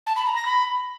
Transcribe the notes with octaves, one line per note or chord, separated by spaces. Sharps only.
A5
B5
A#5
A#6
B5